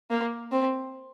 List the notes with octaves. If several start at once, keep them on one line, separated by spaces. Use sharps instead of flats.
A#3
C4